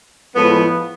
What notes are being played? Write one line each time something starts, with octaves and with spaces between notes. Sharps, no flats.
A2 F3 G#3 B3